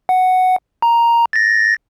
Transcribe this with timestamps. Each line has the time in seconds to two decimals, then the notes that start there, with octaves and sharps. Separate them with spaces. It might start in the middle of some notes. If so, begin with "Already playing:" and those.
0.09 F#5
0.82 A#5
1.33 A6 A#6